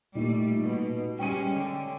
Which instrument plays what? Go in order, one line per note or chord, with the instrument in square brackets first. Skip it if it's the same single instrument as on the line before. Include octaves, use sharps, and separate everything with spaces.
[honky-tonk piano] A#2 D#4 [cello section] G3 A3
[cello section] B2
[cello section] G3 G#3 C#4 [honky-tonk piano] G5 D#7
[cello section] D3